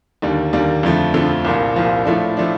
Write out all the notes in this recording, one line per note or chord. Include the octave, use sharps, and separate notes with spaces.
D#2 D3 G3 A#3
D#2 D3 G3 A#3
F2 D3 F3 A3
F2 D3 F3 A3
C2 A#2 F3 A#3
C2 A#2 F3 A#3
A2 F3 A3 D4
A2 F3 A3 D4